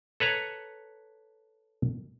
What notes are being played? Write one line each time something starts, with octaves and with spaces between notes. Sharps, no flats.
A4 B4 C#5 A#5